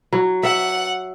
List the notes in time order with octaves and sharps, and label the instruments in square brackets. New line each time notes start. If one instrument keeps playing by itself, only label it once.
[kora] F#3
[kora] E5 [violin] F#5